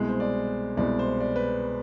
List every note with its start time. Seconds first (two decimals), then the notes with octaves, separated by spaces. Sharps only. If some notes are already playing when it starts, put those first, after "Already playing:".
Already playing: C2 B2 G#3
0.09 C5
0.20 D5
0.77 C2 B2 G#3 D5
0.99 C5
1.20 D5
1.36 B4